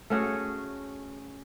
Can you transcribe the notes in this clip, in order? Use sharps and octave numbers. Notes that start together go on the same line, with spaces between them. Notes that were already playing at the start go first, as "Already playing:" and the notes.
A3 C#4 F#4 G#4